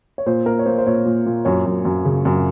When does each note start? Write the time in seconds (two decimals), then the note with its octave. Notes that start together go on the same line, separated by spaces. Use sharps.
0.18 C#5
0.26 A#2 C5
0.46 A#3 A#4
0.59 C#5
0.66 A#3 C5
0.78 C5
0.87 A#2 C#5
1.05 A#2
1.26 A#2
1.45 F#2 C#5
1.66 F#2
1.85 F#2
2.05 C#3
2.25 F#2